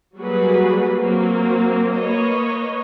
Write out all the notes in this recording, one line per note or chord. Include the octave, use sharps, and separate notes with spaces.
F#3 G3 A#3 F#4 G#4 B4
F#3 A#3 C4
A#3 B4 C#5 D#5